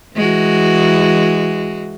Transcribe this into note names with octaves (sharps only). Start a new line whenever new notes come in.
E3 G#3 F#4